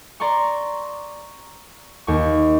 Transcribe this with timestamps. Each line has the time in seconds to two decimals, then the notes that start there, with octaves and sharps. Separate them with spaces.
0.20 D5 A#5 C6 C#6
2.07 D#2 C#6